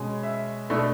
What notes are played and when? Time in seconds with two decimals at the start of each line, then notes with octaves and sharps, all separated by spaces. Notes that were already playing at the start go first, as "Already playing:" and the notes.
Already playing: B2 G#3 C#4 G#5
0.23 E5
0.70 B2 A3 D4 E5